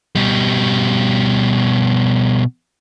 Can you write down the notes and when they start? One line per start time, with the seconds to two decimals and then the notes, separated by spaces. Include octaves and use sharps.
0.15 B2 G3